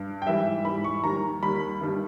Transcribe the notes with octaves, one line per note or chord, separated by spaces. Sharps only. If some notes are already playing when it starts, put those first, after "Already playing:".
Already playing: G2
G5
G#2 E3 G3 E5
G#2 E3 G3 B5
C#6
D#2 D#3 G3 A#5
D#2 D#3 G3 B5
G2 D#3 G3